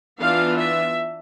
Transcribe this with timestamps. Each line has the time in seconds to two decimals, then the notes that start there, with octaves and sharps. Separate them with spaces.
0.19 E3 B3 D4 F4 F5
0.58 E5